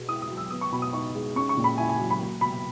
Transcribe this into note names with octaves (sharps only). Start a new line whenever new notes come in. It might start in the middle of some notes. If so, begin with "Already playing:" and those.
Already playing: B2 G#3 B3
E4 D#6
D#6
F#3
E6
B3 D#6
C#6
B2 B5
D#6
D#4 C#6
G#3
C#4 C#6
C#6
A#2
B5
E4 G#5
G#5
F#3
B5
A#3
B2 B5